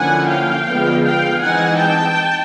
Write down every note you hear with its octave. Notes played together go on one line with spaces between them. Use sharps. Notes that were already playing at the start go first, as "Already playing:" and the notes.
Already playing: D3 F3 A#3 C#4 E4 F#5 G#5
F5 G5
D3 F3 G#3 B3
F5 G5
E3 G#3 C4 D#4 F#5 G#5
G5 A5